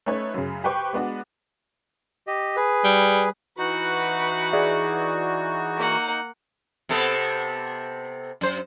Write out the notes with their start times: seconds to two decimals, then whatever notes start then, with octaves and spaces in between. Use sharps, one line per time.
0.06 A3 C#4 D#4 B4 C#5
0.34 F#2 C#3
0.64 G4 B4 C5 G5 C#6 D6
0.93 G#3 B3 D4 F#4
2.27 G4 D#5
2.56 G#4 B4
2.84 G3
3.58 E3 D#4 F#4 B4 F#5
4.53 G#4 D5 E5
5.77 A#3 F#5
6.89 C3 B3 A4
8.41 F#2 C5